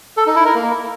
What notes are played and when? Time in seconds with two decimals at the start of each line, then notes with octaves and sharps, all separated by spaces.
0.17 A4
0.26 D#4
0.36 E4
0.45 A#4
0.55 A#3